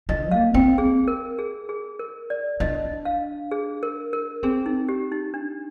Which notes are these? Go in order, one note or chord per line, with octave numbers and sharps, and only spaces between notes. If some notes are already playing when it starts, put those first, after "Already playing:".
D3 D#5
A#3 F5
C4 G5
G#4
A#4
G#4
G#4
A#4
D5
D4 D#5
F5
G#4
A#4
A#4
C4 G#4
D#4
G4
D#4
D4